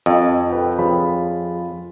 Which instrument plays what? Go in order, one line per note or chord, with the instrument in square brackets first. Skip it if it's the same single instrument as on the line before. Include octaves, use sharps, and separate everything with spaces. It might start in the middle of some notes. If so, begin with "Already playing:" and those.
[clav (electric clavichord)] F2 [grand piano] D#5
[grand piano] A4 B4 G5
[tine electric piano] F3 G#4 [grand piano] F4 C#5 B5